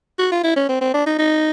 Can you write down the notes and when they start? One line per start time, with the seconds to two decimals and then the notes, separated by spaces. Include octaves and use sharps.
0.19 F#4
0.32 F4
0.44 E4
0.56 C#4
0.69 C4
0.81 C4
0.94 D4
1.06 D#4
1.19 D#4